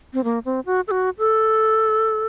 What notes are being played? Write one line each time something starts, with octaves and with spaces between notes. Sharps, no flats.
C4
A#3
C4
F#4
A4
F#4
A4